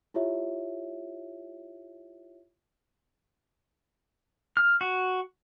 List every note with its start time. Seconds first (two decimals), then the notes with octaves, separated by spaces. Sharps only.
0.14 E4 F4 G4 C#5 E5
4.57 F6
4.81 F#4